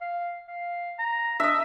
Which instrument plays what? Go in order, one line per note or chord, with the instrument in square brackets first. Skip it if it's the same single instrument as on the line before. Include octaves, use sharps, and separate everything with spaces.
[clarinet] F5
F5
A#5
[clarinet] D4 [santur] D#5 E5